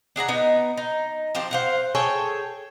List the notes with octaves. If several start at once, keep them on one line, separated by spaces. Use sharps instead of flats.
D4 G#4 F#5 A#5
B3 D#4
D#4
F3 C4 G4
C5 F5 F#5
G#4 A4 C#5 G5